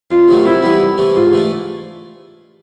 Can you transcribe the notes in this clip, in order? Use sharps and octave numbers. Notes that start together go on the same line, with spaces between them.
F2 F4
C3 D#3 F#3 A3
C3 E4
E3 G3 B3
C2
C3 E3 A3
G#2 F4
E3 A3 D4